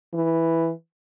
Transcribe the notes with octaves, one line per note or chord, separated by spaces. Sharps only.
E3